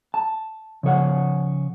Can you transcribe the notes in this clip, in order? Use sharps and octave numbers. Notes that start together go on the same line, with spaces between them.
A5
C#3 F3 C#5 F#5